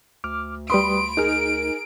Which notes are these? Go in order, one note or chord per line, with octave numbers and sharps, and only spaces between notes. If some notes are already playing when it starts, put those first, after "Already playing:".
D2 D6 F6
G3 B4 B5 C6 D#6 D7
D#4 G#4 A#4 F6